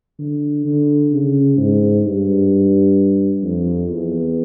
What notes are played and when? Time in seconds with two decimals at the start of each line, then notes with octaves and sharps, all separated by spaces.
0.19 D3
0.65 D3
1.12 C#3
1.57 G#2
2.05 G2
3.43 F2
3.90 E2